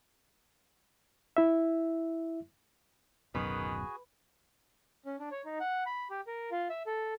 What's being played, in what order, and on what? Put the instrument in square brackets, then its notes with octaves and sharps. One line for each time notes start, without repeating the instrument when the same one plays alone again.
[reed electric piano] E4 E5
[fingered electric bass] D1 F#2 B2 [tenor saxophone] D#3 [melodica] F#4 G#4 G#5 [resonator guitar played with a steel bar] B4
[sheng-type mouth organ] C#4
D4
C#5
D#4
F#5
B5
G4
A#4
F4
E5
A4